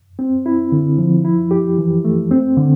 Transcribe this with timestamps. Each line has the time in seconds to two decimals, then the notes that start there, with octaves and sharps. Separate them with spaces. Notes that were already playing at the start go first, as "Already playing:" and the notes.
0.19 C4
0.46 E4
0.72 D3
0.98 F3
1.25 E4
1.51 G4
1.79 E3
2.05 A3
2.31 C4
2.57 D3